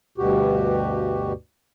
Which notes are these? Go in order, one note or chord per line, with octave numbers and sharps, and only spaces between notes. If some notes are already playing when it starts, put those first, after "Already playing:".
D2 G2 B2 F#4 G4